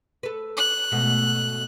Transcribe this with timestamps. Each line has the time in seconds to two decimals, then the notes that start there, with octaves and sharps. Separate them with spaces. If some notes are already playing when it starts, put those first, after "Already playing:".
0.23 A4 B4
0.57 F#6
0.92 G#2 B2 A3